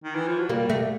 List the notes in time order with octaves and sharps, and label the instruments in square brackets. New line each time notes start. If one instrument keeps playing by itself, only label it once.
[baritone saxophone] D#3
E3
F3
F#3
[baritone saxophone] G3 [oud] A#3
[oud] A3